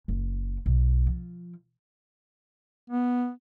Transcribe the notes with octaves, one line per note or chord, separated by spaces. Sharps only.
F#1
B1
F3
B3